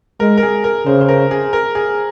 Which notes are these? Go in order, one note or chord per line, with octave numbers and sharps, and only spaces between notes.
G#3 A#4
A#4
G#4
A#4
C#3 C5
C5
A#4
G#4
A#4
G#4